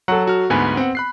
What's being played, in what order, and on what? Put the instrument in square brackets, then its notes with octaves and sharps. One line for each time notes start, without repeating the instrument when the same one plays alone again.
[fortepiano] F#3 A4 [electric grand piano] F#5
[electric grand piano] F#4 F6
[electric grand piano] D2 G#2 G#5 [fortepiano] B3
[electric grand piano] C4 F#5
B5 F#6 C7